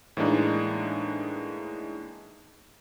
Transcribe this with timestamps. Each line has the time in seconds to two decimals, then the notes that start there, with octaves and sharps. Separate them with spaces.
0.17 A2 E3 G#3 A#3 D4 D#4